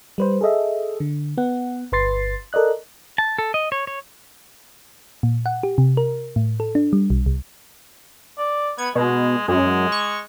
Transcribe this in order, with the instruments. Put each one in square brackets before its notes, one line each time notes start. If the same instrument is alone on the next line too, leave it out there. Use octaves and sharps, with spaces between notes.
[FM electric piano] G3 B4 C5
G#4 A4 D#5 E5
D3
B3 F#5
G1 B4 C6 A6 C7
A4 A#4 D5 D#5 F#6
[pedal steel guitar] A5
A4
D#5
C#5
C#5
[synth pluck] A#2
F#5
G4
C3
A#4
A2
A4
D4
G3
B1
C2
[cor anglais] D5
[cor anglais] B3 [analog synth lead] G#6
[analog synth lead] B2 [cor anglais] G#3
[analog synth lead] F#2 [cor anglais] G#3
[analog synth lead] C#6